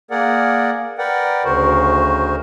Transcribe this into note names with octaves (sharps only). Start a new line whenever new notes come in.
A#3 G#4 A#4 D5 F#5
A#4 B4 D5 F#5 G5
D2 C#3 F#4 A#4 C5